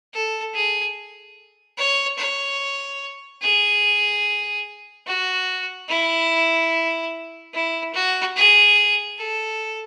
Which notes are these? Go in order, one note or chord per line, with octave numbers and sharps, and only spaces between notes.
A4
G#4
C#5
C#5
G#4
F#4
E4
E4
F#4
G#4
A4